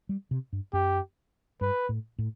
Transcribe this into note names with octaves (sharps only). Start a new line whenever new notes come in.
G3
C3
G2
F#2 G4
G2 B4
A2
A2